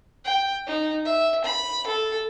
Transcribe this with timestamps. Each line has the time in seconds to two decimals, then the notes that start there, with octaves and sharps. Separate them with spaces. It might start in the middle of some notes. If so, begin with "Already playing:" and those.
0.25 G5
0.67 D#4
1.05 E5
1.44 B5
1.87 A4